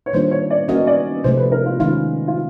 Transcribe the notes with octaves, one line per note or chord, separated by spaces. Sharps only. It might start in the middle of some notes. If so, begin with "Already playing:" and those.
C#5
D#3 G3 A#3 D4 F4 C5
C#5
D5
A#3 C#4 F#4 A#4 D#5
D5
C3 F3 A3 C5
B4
A#4
F4
D#3 G#3 C#4 F4
F4